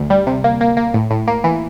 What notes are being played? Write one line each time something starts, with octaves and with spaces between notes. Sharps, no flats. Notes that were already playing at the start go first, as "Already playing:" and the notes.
Already playing: D2
G3
C3
A#3
A#3
A#3
A2
A2
A#3
E3